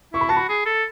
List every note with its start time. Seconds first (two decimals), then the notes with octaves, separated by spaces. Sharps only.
0.13 E4 C#6
0.21 B5
0.29 F#4 A5
0.37 B5
0.49 G#4
0.66 A4